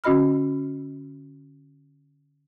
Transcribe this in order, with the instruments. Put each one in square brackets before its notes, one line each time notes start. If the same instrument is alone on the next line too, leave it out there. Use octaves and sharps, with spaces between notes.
[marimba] D3 C#4 F#4 D#5 B5 F6